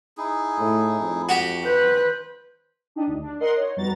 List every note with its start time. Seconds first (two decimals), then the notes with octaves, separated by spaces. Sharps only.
0.17 D#4 E4 G#4
0.58 A2
1.00 F2
1.29 F#4 G4
1.65 B4 C5
2.95 D4 D#4 G4 D#5
3.07 D2 D3
3.21 D4
3.40 A#4 D#5 F#5 C6
3.56 D#4 C#5
3.76 F2 G3 B3 F#4 A#5 A6